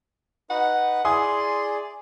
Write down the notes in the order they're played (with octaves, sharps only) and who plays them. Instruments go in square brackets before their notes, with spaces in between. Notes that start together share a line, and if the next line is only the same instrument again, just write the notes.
[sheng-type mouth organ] D#4 B4 [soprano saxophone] F#5
[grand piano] E4 G#5 D#6 [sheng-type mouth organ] G#4 D5 [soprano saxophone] C6